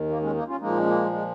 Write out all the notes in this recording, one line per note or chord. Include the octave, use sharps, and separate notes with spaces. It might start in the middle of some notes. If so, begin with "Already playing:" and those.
Already playing: D#2 D#3
A#3
G#3 C#4
A#3 D#4
C#4 F4
A#2 F3 G#3 A#3 D#4
C#4
A#3
G#3